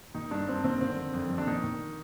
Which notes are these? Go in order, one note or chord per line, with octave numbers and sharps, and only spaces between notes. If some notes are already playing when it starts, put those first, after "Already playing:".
D#3 D#4
G2 D4
G2 C4
D#3 C4
D3 C4
F2
F2
F2
D4
D#3 D#4
D#3